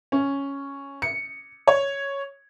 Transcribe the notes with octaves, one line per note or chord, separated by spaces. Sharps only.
C#4
C#7
C#5